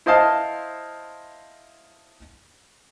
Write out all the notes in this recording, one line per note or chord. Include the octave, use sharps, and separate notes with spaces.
E4 C5 D#5 F5 A5